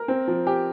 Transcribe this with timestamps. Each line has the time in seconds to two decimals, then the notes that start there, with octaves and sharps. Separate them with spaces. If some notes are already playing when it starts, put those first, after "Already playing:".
Already playing: A#4
0.08 C4
0.28 F3
0.47 G4